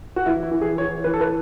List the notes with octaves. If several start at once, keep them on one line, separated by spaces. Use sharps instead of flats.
F#4
E3 E4
E4
E3
G#4
E3 C#5
E3 B4
A4
B4